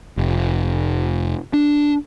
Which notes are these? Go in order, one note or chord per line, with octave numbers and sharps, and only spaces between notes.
F1
D4